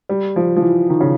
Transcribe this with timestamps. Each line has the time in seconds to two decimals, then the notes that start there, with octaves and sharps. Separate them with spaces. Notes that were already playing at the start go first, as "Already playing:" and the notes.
0.09 G3
0.36 F3
0.56 F3
0.62 E3
0.90 D#3
1.00 C#3